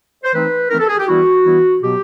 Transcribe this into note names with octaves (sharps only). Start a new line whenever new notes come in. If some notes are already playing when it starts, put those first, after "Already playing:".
C5
E3 A3 C4 D#4 B4
E3 A3 C4 D#4 A#4
A4
G#4
G4
E3 G3 B3 E4 F#4
E3 G3 B3 E4
B2 F#3 B3 G4